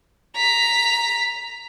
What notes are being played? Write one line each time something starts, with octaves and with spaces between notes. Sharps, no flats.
A#5 B6